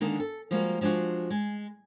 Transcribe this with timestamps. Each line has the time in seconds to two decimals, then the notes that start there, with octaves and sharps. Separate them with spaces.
0.01 D3 D#3 G#3 A#3
0.20 A4
0.51 F3 G3 G#3 A#3 F#4
0.81 F3 G#3 D4 F4 F#4
1.30 G#3